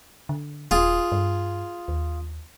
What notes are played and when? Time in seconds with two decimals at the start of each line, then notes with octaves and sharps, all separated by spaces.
0.29 D3
0.71 D#1 F4 G#4
1.12 G2
1.88 D#2